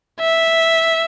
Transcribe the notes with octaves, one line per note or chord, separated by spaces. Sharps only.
E5